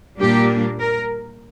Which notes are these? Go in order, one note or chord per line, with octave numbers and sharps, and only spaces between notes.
A#2 G3 A#3 D4 G4
A#4